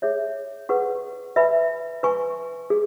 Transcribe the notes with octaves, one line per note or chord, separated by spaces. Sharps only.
G#4 C#5 E5
G#4 B4 F#5 C#6
B4 E5 G#5 B5
B4 G#5 C#6
G#4